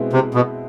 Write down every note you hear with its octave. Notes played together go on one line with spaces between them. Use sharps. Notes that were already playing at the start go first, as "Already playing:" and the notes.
Already playing: B2 G#3 C4 E4 B4
C3
B2